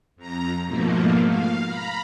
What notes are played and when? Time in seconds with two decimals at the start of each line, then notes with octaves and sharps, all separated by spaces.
0.16 F2 A#5
0.67 G#2 B2 F3 A3 A#3
1.27 F5
1.65 A#5 B5